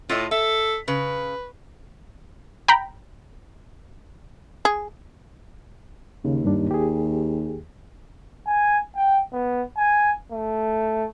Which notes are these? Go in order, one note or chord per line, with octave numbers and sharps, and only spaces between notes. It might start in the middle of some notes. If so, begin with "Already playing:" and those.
A2 F4 A4 D#5
A4 E5
C#3 B4
G5 A#5 B5
G#4
D#2 C#3
G2 G3 D4
G4 G#4
G#5
G5
B3
G#5
A3